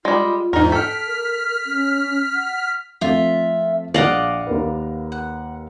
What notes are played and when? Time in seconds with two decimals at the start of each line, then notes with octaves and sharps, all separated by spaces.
0.05 G3 G#3 F4
0.53 E2 G#2 D#4 A#4
0.72 A4 G5 F6 B6
1.07 A#4
1.66 C#4
2.33 F#5
3.01 F3 A3 C4 F4 E5
3.94 A#1 D5 D#5 F5 F#5 C7
4.47 D#2 A#4 B4
5.12 F#5